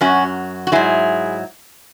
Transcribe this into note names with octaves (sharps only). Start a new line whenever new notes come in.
F#2 F#3 C#4 F#4
F#4
G#2 F#3 E4 G#4